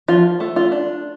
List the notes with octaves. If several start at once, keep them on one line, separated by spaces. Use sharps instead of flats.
F3 F4
A3
F4
D4